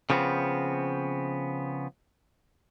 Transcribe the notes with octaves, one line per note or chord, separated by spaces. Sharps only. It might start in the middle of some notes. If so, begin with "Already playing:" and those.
C#3 F3 B3 C4